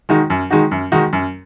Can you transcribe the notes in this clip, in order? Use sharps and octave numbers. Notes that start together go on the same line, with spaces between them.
D#3 G#3 D#4 F#4
F#2
D#3 G#3 D#4 F#4
F#2
D#3 G#3 D#4 F#4
F#2